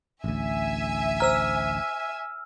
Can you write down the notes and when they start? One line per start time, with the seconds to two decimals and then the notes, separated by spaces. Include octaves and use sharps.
0.24 A1 D2 E5 G#5
1.20 C5 A#5 E6 F6